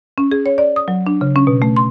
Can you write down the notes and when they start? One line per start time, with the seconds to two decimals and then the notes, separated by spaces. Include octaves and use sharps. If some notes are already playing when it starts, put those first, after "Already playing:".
0.18 C#4
0.32 G#4
0.46 C#5
0.58 D5
0.76 D#6
0.88 F#3
1.07 D4
1.21 C#3
1.36 C#4
1.47 B2
1.62 A3
1.77 C6